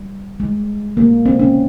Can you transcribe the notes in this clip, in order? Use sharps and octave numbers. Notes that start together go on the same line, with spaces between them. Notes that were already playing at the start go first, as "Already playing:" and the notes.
Already playing: G3
G#3
A#3
C4
C#4